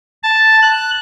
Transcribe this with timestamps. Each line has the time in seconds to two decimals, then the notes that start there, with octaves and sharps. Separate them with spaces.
0.23 A5
0.62 F#6